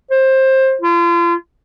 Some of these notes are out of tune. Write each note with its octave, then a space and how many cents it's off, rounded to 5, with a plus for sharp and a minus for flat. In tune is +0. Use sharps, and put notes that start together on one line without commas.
C5 +20
F4 -40